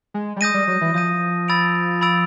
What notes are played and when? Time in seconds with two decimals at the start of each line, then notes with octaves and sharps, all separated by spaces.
0.14 G#3
0.36 G3
0.41 G#3 D#6 G6 A#6 D#7
0.54 G3
0.68 F#3
0.81 E3
0.94 F3 D#6 G6 A#6 D#7
1.48 B5 E6 A6 D7 F7
2.01 B5 E6 A6 D7 F7